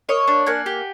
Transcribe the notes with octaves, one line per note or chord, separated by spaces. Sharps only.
A#3 C#5 D#5
D4
A#3 F#5 G#5
G4